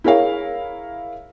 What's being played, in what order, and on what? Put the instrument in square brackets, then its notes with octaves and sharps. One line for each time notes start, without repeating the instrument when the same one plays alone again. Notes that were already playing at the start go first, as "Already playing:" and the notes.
[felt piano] E4 G#4 A#4 C#5 F5